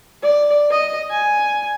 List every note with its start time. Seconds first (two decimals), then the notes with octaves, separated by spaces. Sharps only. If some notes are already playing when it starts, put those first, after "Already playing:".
0.23 D5
0.71 D#5
1.11 G#5